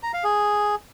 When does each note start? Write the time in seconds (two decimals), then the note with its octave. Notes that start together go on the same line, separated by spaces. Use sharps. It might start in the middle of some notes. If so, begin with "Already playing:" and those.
0.03 A#5
0.14 F5
0.24 G#4